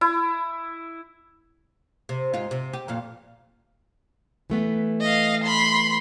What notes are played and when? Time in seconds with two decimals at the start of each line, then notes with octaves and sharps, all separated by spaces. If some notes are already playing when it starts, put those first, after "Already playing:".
0.01 E4
2.09 C3
2.34 G#2 F4
2.51 C3
2.73 G4
2.88 F2 A#2 F5
4.50 E3 A3 B3
5.01 D#5 F5
5.44 B5 C6